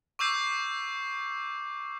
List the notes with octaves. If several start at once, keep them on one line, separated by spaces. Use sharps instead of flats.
C#6 D6 E6 G6 C7